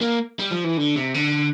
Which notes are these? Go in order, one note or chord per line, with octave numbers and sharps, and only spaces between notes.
A#3
G3
F3
E3
D3
C3
D3